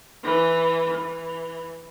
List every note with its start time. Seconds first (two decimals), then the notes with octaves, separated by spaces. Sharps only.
0.23 E3
0.94 E3